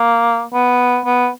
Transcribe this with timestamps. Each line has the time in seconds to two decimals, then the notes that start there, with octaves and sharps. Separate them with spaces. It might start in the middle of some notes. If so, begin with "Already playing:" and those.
Already playing: A#3
0.53 B3
1.05 B3